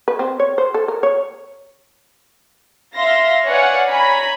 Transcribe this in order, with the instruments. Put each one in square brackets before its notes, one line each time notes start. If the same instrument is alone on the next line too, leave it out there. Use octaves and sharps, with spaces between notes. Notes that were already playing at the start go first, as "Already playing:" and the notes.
[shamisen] B4
C4
C#5
C5
A4
A#4
C#5
[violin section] E5 F5 C6 A#6
B4 C#5 D5 F5 F#5 G#5
C#5 G#5 A#5 B5